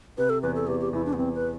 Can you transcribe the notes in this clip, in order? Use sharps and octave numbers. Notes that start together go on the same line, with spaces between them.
C3 B4
A4
E2 B4
A4
E2 G4
G4
E2 E4
D4
B3
E2 C4
B4